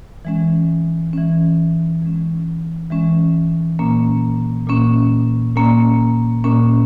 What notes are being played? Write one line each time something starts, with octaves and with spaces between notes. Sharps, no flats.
E3 G#3 C#4
E3 G#3 C#4
E3 G#3 C#4
E3 G#3 C#4
A#2 A#3 C#4
A#2 A#3 C#4
A#2 A#3 C#4
A#2 A#3 C#4